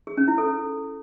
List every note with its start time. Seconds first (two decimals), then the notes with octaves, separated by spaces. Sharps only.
0.07 G#4
0.17 C#4
0.28 E4
0.38 A4